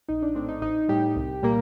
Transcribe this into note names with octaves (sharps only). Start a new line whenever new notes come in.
A#1 D#4
D4
A2 A3 C4 D4
D#4
A1 D#4
A2 G3 G4
C2
A#2 G3 A#3